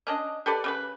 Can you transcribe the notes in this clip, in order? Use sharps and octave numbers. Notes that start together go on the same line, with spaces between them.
C#4 D4 D#5
G4 A4 B4 D5
C#3 F#4 B4